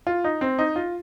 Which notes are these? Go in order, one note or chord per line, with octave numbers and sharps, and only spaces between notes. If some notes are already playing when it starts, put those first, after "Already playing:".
F4
D#4
C4
D#4
F4